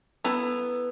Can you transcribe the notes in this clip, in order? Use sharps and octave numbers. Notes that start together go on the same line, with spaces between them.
B3 E4 A4 A#5